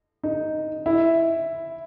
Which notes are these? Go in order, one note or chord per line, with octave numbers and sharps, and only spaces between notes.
D#4
E4